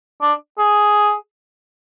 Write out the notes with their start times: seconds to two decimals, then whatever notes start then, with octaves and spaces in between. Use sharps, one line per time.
0.21 D4
0.58 G#4